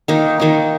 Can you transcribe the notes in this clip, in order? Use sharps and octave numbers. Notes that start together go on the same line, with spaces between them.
D#3 A#3 D#4
D#3 A#3 D#4